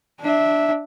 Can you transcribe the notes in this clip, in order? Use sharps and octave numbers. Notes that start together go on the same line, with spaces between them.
D4 E5